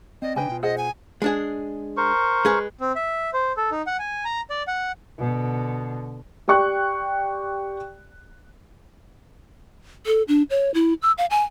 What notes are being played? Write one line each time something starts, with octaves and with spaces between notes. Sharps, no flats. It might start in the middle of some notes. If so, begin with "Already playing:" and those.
C4 D5 D#5
C#3 D4 B4 D#5 G5 G#5
B2 F4
G#4 C5 D#5 F#5
G#5
G#3 D4 G#4
A#4 C5 C#6
G#3 G#4 B4
C4
E5
C5
A4
D#4
F#5
G#5
A#5
D5
F#5
B2 D3
G4 D5 G5 C#6 F#6
A4
D4
C#5
E4
E6
F5
G#5